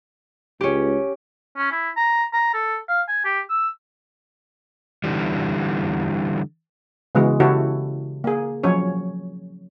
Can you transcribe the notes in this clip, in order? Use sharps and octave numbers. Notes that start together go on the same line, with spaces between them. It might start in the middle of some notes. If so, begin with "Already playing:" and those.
C#2 C#4 G4
C#4
E4
A#5
A#5
A4
F5
G#5
G4
E6
D3 E3 G3
C#3 E3 G#3 B3 F#4
C#3 E4 F#4 G4 A4 C#5
A#3 G#4
F3 F#3 C#4 C#5